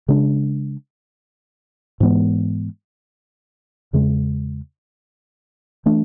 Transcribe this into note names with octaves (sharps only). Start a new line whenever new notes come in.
C#3 G#3 D4
G#2 E3 G#3 B3
E2 C#3 G#3
E3 A3 D4